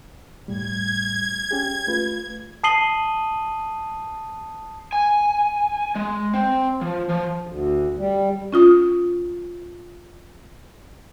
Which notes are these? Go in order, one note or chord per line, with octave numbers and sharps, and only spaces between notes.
F2 A2 G3 G#6
C#4 G4 G#4
A3 F4 B4
A5 D#6 C7 D#7 F#7 G7
G#5
G#3
C4
F3
F3
D2
G3
C#4 F4 D#6